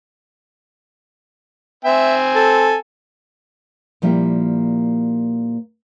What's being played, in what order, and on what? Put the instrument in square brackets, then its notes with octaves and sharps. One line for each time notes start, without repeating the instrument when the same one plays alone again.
[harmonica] C4 G#5 [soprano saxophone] E5
[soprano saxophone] A4
[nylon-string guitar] A#2 F3 G3 A#3 E4 G4